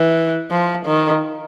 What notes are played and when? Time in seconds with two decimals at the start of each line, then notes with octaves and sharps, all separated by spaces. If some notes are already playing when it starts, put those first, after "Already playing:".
Already playing: E3
0.51 F3
0.86 D#3